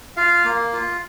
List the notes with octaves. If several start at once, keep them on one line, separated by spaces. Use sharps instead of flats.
F4 F5
A#3
F4